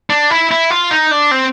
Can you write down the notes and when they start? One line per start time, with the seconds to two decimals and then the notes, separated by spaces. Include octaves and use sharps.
0.10 D4
0.31 E4
0.51 E4
0.70 F4
0.91 D#4
1.11 D4
1.31 C4